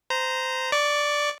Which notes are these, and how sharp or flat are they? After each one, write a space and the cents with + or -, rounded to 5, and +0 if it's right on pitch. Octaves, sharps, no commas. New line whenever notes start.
C5 -20 A#5 +0
D5 +0 C#6 +30